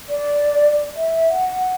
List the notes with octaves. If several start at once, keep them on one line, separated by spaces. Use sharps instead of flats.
D5
E5
F#5